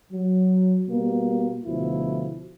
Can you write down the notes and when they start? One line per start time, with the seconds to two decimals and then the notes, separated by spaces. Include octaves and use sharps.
0.12 F#3
0.88 B2 G3 A#3
1.65 D2 B2 F3 E4